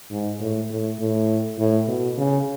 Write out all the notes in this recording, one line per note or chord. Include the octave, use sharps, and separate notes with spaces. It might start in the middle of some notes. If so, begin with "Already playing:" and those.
G#2
A2
A2
A2
A2
B2
C#3